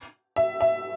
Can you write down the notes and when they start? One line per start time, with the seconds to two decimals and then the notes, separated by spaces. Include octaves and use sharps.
0.36 E5
0.61 E5